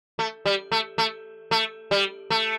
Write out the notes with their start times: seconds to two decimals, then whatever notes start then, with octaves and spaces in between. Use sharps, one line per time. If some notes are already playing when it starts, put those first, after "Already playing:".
0.19 A3
0.46 G3
0.72 A3
0.98 A3
1.51 A3
1.91 G3
2.30 A3